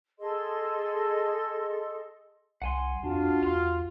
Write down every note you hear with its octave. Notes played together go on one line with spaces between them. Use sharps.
G#4 A4 D#5 C6
C2 F#5 G#5 C6
F2 D4 F4 F#4
E2 F5 C6